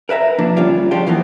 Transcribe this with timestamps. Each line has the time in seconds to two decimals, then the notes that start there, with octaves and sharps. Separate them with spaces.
0.09 A#4 B4 E5 A#5
0.39 F3 A#3 D4
0.56 D2 G3 C#4 F4 D5
0.91 F3 F#3 G#3 D4 F4 G4
1.07 E2 E3 F3 A#3 B3